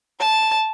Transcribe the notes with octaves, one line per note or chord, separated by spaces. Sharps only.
A5